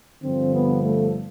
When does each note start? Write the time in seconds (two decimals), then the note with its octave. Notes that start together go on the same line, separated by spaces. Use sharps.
0.23 G2 D3 F3 C4
0.53 B3
0.83 A3